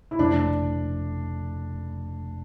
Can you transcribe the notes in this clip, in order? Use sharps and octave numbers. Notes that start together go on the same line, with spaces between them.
E4
G1 F2 C3 F3 A3 D4